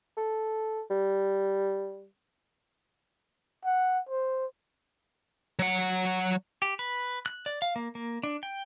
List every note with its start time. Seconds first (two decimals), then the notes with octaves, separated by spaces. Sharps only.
0.17 A4
0.90 G3
3.65 F#5
4.09 C5
5.59 F#3 F#5
6.62 G4
6.79 B4
7.26 F#6
7.46 D5
7.62 F5
7.76 A#3
7.95 A#3
8.23 D4
8.43 G5